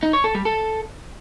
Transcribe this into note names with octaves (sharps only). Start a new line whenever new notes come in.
D#4
C#5
A4
G3
A4